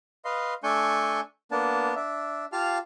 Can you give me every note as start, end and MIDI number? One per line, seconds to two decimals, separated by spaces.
0.25 0.54 71
0.25 0.54 75
0.25 0.54 77
0.25 0.54 84
0.63 1.20 57
0.63 1.20 62
0.63 1.20 80
0.63 1.20 85
0.63 1.20 91
1.51 1.94 58
1.51 1.94 59
1.51 1.94 62
1.51 1.94 81
1.96 2.45 62
1.96 2.45 76
2.52 2.78 65
2.52 2.78 67
2.52 2.78 77
2.52 2.78 81
2.52 2.78 89